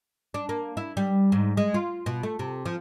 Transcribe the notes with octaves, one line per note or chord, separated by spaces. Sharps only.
D4
A#3
E4
G3
G#2
G#3
F4
B2
A3
C3
F3